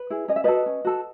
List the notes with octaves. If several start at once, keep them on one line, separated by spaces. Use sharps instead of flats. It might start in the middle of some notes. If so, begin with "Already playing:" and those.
Already playing: B4
E4 G#4
C#4 D#5
E5
F#4 A4 B4 D#5
C#4
F#4 A4